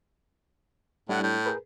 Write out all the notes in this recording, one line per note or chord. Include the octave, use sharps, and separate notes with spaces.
A2 G3 D4 E4 F#5
A2 G6
G#4 A#4 B4